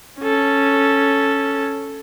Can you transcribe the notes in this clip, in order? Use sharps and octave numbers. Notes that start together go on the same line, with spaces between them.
C#4 A4